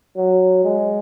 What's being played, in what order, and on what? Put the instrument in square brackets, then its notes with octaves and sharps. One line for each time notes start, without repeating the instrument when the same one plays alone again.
[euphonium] F#3
G#3